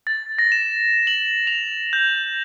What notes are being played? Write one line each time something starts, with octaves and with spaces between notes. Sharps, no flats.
A6
A#6
E7
F#7
F7
G6